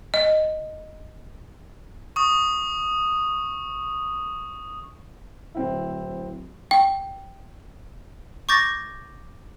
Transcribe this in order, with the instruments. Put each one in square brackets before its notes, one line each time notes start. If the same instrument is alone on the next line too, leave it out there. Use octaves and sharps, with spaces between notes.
[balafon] D#5
[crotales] C#6 D#6
[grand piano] D1 C4 E4
[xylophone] G5
C#6 D6 G6 A6 A#6